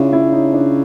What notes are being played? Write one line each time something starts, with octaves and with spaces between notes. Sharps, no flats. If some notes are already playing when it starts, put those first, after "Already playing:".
Already playing: C#3 C#4 D4 E4 F4
E4
D#4
D4